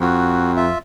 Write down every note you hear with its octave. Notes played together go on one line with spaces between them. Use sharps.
F2 F#4
F4 E5